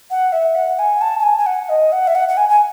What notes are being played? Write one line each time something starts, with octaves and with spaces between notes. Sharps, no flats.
F#5
E5
F#5
G#5
A5
A5
G#5
G#5
F#5
D#5
F#5
E5
F#5
F#5
G#5
G#5